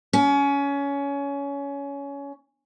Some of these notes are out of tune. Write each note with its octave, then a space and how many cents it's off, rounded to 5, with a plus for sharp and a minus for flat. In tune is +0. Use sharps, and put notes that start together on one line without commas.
C#4 +20